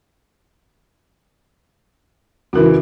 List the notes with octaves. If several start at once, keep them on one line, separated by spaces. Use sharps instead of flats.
C#2 E3 F#4 A#4